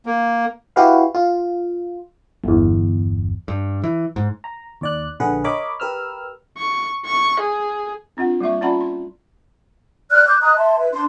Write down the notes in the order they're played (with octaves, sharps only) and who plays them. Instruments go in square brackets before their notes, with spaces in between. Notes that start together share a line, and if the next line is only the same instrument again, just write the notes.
[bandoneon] A#3
[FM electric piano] E4 F#4 G4 B4 F5
F4
G1 E2
[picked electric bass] G2
E3
G#2
[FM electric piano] A#5
D#2 D5 F#6
A#1 D3 G#4 B4 F#5
A#4 C#5 D#5 B5 D6
G4 A#4 B4 E6 F6
[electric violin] C#6
C#6
G#4
[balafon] C4 D4 F4 F#5
G3 A#3 E5 C#6
C#4 F4 D5 F#5 A#5 B5
C6
[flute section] D5 F6 F#6
D6 F#6 G6
D#5 A#5 D#6 F#6
E5 A5 C6
B4 E5
D4 C6